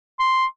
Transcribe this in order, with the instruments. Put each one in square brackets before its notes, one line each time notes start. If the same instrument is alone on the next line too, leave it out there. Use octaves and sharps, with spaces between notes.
[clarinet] C6